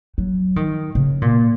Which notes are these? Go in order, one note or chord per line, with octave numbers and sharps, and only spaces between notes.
F#3
D#3
C#3
A#2